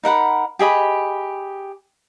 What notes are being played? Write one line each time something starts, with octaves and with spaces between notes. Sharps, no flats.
D#4 A#4 F#5 B5
G4 G#4 D#5 B5